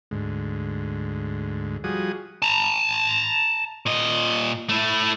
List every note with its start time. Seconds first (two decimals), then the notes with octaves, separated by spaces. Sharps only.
0.11 D2 G#2
1.84 F3 G3 F#4 G#4 D#6
2.42 A5 A#5
3.86 A#2 D#5
4.69 A3 E4